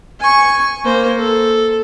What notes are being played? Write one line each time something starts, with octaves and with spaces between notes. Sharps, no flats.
G#5 C#6
A#3 C5
A4